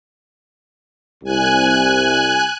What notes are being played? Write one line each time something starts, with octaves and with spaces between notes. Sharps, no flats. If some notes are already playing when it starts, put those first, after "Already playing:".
C2 G#5 F#6